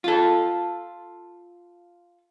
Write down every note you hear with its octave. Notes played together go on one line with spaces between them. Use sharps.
F4 A4